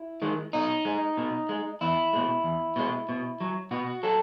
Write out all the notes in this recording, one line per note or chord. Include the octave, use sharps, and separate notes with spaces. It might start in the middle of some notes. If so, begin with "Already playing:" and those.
Already playing: E4
D#3 G#3
B2 D#4
G#3
B2
G#3
E2 E4
B2 G#3
E2
B2 G#3
B2
F#3
B2 F#4
F#3 A4